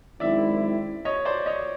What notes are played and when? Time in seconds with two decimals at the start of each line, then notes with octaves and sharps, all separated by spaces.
0.20 F#2 D#3 G#3 C4 E4 D5 E5
1.05 C#5 D#5
1.25 C5 D5
1.46 C#5 D#5